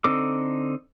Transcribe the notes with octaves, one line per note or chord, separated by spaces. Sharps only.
D3 C4 D#4 A4 D6